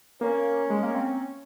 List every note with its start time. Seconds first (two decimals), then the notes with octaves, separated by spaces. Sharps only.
0.21 A#3 C#4
0.70 G#3
0.83 A#3
0.95 C4